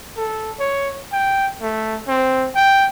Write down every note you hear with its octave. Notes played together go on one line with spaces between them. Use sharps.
A4
C#5
G5
A3
C4
G5